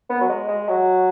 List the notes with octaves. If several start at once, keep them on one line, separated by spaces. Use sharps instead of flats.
B3
F#3
G#3
G#3
F#3